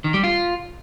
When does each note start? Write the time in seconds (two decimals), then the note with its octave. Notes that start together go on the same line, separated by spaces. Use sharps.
0.04 D#3
0.14 G3
0.24 F4